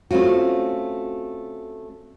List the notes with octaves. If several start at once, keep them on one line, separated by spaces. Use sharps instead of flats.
A3 C4 C#4 F4 F#4